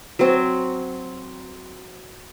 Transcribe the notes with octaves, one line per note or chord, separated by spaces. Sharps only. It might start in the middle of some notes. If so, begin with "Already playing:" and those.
F#3 C4